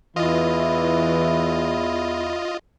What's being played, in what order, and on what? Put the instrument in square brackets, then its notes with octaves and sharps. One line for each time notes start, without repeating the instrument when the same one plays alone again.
[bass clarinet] E2 [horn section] E3 [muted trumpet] E4 [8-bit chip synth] F4 D#5